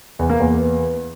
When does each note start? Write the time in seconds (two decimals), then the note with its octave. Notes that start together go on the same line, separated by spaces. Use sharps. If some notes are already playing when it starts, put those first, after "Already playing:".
0.19 E2
0.30 A#3
0.40 E2